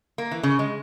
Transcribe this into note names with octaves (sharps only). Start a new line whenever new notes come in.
A#3
E3
C#3
G#3